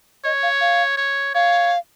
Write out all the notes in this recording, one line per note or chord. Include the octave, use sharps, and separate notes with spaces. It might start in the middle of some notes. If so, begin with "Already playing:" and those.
C#5 D#5
F5
F5
C#5
C#5 F5